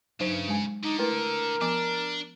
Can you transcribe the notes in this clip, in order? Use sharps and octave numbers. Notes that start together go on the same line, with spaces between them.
G2 C#3 F#3 D#4 C5
G#3 G#5
D3 D#4
A3 E4 A#4 B4
F3 B3 D4 D6